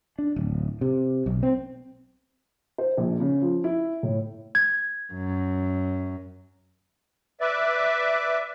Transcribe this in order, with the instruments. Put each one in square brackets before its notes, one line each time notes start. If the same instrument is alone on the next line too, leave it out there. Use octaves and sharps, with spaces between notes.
[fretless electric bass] D4
D1
C3
B1
C4
[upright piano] C5
A#1
C#3
F3
E4
A2
[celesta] G#6
[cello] F#2
[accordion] B4 D5 E5